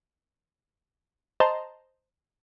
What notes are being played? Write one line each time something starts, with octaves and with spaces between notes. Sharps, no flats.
C5 D#5 A5 A#5 C6